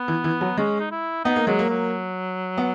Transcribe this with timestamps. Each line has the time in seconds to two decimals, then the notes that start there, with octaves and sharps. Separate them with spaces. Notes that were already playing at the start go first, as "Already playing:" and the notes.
Already playing: B3
0.08 E3
0.24 E3
0.41 F#3
0.58 G#3 C#4
0.80 D#4
0.91 E4
1.24 B3 D#4
1.36 A#3
1.47 F#3 G#3
1.59 A#3
1.70 F#3
2.58 B3